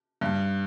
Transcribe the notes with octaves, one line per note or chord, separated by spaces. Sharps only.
G2